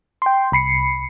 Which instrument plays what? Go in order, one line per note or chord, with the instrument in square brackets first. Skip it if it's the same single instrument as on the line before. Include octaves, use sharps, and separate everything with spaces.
[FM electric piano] G5 C6
C2 B5 C7 C#7